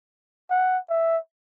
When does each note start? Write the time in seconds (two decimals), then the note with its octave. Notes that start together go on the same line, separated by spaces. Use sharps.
0.50 F#5
0.90 E5